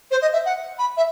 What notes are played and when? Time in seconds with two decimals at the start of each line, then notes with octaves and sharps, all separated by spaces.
0.11 C5
0.21 D#5
0.32 E5
0.45 F#5
0.78 B5
0.97 E5